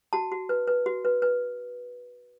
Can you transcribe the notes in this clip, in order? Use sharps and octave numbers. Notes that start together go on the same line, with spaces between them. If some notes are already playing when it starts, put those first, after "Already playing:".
F#4 A5
F#4
B4
B4
F#4
B4
B4